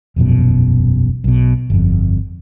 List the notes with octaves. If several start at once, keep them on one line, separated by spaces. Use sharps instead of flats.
E1 A#1 F#2 B2
B1 B2
G1 F2